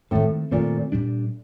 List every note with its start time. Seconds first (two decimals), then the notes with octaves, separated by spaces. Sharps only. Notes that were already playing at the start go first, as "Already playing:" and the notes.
0.11 A2 D#3 A3 C4
0.51 A#2 D#3 A3 C4
0.92 A#2 G3 D4